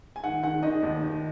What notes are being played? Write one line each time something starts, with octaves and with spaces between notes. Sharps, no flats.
G#5
D#3 F#5
D#3 F#5
D#3 D#5
D#2
D#3